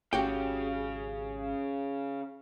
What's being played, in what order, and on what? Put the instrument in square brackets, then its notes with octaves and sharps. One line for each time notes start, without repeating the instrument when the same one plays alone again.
[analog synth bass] G#1 [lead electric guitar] C#3 C#4 [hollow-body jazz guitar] F#4 G4 G5